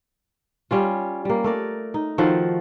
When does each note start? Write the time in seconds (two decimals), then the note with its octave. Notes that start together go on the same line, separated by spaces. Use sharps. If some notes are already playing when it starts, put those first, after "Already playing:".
0.71 G3 C#4 F4
1.25 G3 A#3
1.44 A3 A#4 D5
1.94 D#4
2.18 D#3 F3 F#4 A4